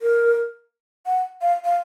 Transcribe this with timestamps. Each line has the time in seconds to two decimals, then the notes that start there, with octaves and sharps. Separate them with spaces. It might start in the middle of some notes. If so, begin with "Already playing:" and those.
0.02 A#4
1.06 F#5
1.42 F5
1.65 F5